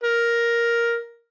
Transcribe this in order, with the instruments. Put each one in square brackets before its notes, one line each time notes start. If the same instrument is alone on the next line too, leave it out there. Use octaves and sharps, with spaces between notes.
[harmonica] A#4